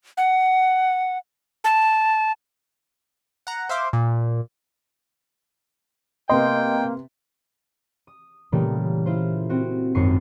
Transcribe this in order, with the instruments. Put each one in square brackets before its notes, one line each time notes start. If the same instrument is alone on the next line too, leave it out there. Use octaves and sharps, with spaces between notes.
[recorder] F#5
A5
[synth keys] F#5 A#5
C5 E5 F5 C6 D6
A#2
[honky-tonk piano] C3 B3 C6 [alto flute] A#3 [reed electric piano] D#5 [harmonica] G5
[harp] D#6
A#2 C#3 E3 G3 A3 A#3
E4 F4 C5
C4 F#4
G#1 F#2 D#4 C#6 C7 D#7